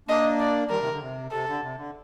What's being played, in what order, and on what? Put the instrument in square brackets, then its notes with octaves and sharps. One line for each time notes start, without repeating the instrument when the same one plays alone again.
[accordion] A#3 D4 [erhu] D#5
[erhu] D5
[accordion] D#3 G3 [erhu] A#4
[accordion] C3 D#3
D3
C3
[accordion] C3 [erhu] A4
[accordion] D3
C3
D3